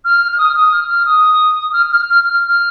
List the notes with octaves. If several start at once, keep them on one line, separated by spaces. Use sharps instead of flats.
F6
F6
D#6
F6
D#6
F6
F6
D#6
F6
F6
F6
F6
F6